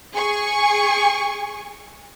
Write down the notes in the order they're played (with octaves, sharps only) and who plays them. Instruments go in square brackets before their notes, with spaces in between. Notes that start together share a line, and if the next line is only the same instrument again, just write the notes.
[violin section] G#4 G#5 C#6